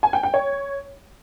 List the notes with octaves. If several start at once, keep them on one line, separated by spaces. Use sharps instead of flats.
G#5
G5
G5
C#5